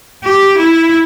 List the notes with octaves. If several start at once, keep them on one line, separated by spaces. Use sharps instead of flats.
G4
E4